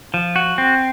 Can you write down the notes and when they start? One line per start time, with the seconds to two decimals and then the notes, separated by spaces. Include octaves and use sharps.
0.14 F3
0.36 F#4
0.58 C4